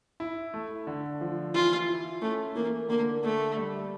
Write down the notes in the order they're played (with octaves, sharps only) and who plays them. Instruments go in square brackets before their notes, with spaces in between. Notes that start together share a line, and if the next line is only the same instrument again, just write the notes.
[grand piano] E4
A3
D3
F3
[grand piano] E3 [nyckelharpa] F4
[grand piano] E4
[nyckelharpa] A3 [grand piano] C#4
[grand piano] E3 [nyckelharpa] A#3
[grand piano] D3 [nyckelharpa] A#3
[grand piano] D3 [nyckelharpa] A3
[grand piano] G3